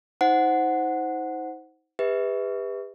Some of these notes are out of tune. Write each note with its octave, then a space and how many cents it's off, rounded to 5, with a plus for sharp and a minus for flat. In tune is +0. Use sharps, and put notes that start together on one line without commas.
D#4 +35 C5 +0 F#5 +0
G4 +45 B4 +5 E5 -30